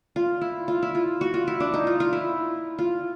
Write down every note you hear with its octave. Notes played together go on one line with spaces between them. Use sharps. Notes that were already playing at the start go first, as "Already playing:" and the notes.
F4
E4
F4
E4
F4
F#4
F4
E4
D4
D#4
F4
F4
E4
F4